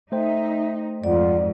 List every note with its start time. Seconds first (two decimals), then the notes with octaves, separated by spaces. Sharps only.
0.12 A3 D#4 C5 E5 G5
1.04 F2 G#2 F4 D5 F#5